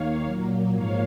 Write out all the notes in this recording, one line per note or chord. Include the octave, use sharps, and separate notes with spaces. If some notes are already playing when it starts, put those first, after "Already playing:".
Already playing: D#2 D#3 A#3 C#5 F5
A#2 F#3 A#3
G#2 F3 A#3 C#5 F5